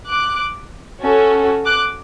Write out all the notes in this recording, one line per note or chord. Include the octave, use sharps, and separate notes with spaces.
D6 F#6
C#4 F#4 A4
D6 F#6